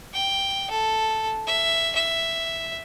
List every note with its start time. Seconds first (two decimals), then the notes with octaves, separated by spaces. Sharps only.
0.14 G5
0.70 A4
1.47 E5
1.95 E5